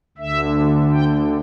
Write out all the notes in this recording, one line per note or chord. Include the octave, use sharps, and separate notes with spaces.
D2 D3 E5
G5